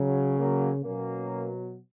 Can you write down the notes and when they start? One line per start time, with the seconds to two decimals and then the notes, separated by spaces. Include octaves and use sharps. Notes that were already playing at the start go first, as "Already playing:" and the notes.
Already playing: C#3 F#3
0.38 F#3 A#3
0.84 B2 F#3 A#3 C#4